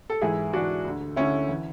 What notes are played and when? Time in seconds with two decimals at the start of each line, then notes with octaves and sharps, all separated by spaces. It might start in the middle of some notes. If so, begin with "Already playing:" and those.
0.10 A4
0.21 G#2 E3 E4 G#4
0.53 G#2 E3 D4 F#4
0.84 D2 D3
1.16 D2 D3 C#4 E4
1.49 E3